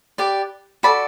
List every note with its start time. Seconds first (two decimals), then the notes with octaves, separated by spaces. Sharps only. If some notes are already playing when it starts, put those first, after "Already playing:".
0.18 G4 B4 D5
0.83 F#4 A4 D5 B5